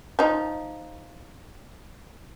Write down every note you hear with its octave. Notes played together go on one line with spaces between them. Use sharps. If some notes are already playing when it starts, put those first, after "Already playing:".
F3 D#4